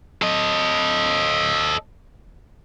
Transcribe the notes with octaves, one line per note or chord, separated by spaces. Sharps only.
A4 D#5